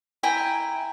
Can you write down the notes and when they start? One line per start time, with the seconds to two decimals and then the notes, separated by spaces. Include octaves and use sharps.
0.23 E4 G5 G#5 A#5